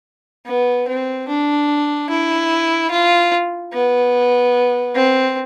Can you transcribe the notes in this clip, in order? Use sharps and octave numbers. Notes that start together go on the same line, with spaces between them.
B3
C4
D4
E4
F4
B3
C4